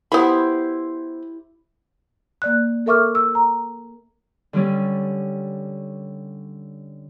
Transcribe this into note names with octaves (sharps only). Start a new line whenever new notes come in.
B3 E4 G4 C5 B5
A#3 D5 F#6
A4 A#4 E5 C#6 D6 F6
E6
A#5
D3 G3 C#4